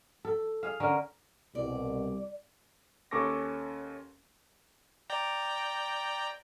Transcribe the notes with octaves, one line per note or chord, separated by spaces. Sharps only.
A4
G#4 F5
D3 C#4 A#4
C2 B2 D5
D#2 C#4 A4 C#6 D6 A#6
D5 G5 A#5